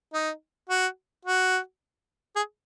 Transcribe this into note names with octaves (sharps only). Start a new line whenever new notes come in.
D#4
F#4
F#4
G#4